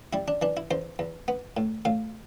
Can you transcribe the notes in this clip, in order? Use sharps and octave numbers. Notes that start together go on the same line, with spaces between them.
G3 E4
D4
E3 D4
E4
E2 C5
E2
B3
A2
A2 F5